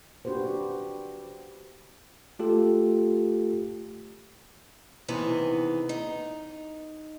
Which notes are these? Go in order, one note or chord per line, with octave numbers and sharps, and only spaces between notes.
D4 F#4 G4 B4 C5
A3 F4 G4 A4
C3 D#3 E3 B3 G#4
D#4